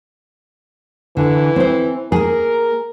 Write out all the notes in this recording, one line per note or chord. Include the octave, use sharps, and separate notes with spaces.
D3 E3
C4 C5
A#3 G#4 A#4